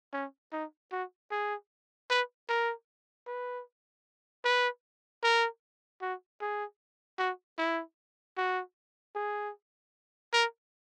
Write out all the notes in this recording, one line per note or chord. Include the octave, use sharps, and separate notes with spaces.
C#4
D#4
F#4
G#4
B4
A#4
B4
B4
A#4
F#4
G#4
F#4
E4
F#4
G#4
A#4